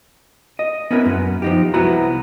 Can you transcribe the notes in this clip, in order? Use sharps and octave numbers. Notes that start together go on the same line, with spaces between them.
D#5
B3 C#4 E4 A#4 B4
F#2 B3
F3 D#4 G4
C2 B3 E4 F#4 A#5 B5